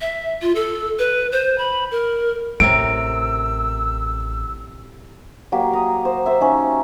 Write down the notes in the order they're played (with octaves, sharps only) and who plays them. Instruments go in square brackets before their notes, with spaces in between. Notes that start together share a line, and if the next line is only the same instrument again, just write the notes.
[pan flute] E5
F4
A4
B4
C5
B5
A#4
[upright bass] A1 [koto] A2 C3 A#4 [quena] E6 [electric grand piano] D7
[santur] F#3 A#3 G4
A#5 D#6
C5
C5 E5
C#4 D#4